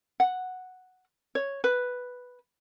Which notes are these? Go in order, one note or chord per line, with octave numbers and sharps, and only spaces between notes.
F#5
C#5
B4